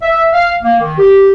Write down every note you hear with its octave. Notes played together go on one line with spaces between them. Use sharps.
E5
F5
A#3
D#3
G4